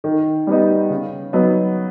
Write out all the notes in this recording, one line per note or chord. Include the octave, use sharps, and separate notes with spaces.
D#3
G3 B3 D#4
C#3
F#3 B3 D#4